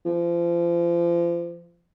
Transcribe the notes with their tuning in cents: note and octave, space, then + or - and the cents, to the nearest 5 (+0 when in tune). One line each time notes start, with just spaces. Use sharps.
F3 -30